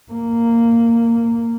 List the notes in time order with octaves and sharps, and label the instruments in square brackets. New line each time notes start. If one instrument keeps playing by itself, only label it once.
[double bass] A#3